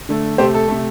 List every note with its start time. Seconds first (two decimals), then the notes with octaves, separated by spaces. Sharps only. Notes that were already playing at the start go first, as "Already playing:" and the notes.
0.09 D3 A3
0.38 C3 A3 G4 C5
0.54 A4
0.68 C3 A3